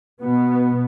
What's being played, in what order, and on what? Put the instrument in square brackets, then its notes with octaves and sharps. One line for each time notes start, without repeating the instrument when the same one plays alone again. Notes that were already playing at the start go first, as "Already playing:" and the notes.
[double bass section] B2 B3